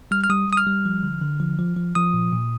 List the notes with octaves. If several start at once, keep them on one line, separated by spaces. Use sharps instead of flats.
G3 F6
F6
G3 D#6
G3 D#6
F6
G3
F3
D3
D3
F3
F3
F3
F3 D#6
A#2
A#2